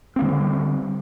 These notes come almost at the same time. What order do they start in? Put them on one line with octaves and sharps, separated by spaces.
C4 A#3 D3 G3